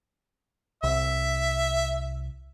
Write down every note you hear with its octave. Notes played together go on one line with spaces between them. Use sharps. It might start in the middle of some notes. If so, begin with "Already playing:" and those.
C2 E5